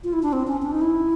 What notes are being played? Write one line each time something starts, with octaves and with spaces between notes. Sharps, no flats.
F4
E4
D4
C4
C#4
D4
D#4
E4